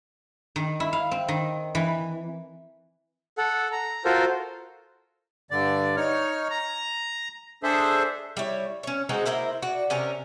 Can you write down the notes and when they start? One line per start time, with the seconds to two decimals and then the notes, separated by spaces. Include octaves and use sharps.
0.56 D#3
0.80 E4
0.93 F5
1.11 C4
1.28 D#3
1.75 E3
3.38 A4 F#5
3.72 A#5
4.05 F4 F#4 A4 A#4 C5
5.51 G2 D3 D5
5.97 D#4 C#5 F6
6.50 A#5
7.63 D4 G#4 A4 C5 E5
8.37 G3 E4 C#5
8.83 C#4 C#5
9.09 G#3 C4 D#4 F#4
9.26 A#3 E4 A#4 C5
9.62 F#4 D5
9.90 C3 C#4 A#4